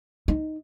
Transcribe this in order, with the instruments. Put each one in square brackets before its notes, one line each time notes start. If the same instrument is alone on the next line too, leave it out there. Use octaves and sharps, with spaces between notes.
[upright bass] D#4